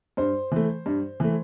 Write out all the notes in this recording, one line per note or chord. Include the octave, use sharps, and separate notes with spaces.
G2 C5
E3 A3
G2
E3 A3